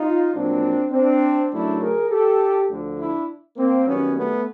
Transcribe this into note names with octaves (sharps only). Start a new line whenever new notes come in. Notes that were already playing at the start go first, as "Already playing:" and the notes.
Already playing: D#4 F4
A#1 A#2 F#3 C4 D4
C4 D4
F#2 C#3 F#3 A3 D4 E4
G#4 A#4
G4 A4
D2 D3 F3
D4 E4
A#3 C4
F#2 D#3 G3 B3 C#4
A3 B3